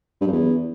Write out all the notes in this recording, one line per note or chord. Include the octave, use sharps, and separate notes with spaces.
G2
F#2
E2